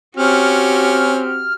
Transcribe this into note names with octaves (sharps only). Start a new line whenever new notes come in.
C4 C#4 F#4 G4 F6